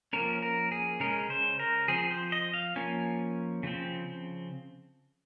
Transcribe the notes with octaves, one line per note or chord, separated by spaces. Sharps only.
F3 A#3 C#4 A#4
A#4
G#4
C#3 G#3 C#4 A#4
C5
A#4
F3 C4 G#4
C5
D#5
F5
F3 A#3 C#4 G#5
C#3 F3 C4